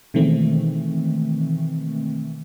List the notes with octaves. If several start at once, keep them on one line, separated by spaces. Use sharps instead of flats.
B2 D#3 E3 G#3 A3 C4